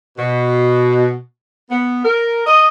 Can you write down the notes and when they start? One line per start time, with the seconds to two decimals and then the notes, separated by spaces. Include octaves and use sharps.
0.18 B2
1.70 B3
2.04 A#4
2.46 D#5